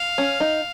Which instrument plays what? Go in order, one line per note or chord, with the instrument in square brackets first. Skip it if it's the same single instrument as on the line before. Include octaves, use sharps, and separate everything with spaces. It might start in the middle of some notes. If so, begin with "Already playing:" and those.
Already playing: [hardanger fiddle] F5
[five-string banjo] C#4
D#4